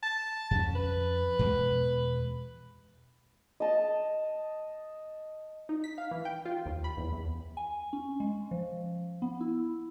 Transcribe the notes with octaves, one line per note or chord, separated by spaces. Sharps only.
A5
F2 C#4
B4
E2 B2 G#3
D#5 A5
D#4
B6
F5
E3
G5
F4
D#2
B5
E2
E2
G#5
C#4
G#3
F3
B3
E4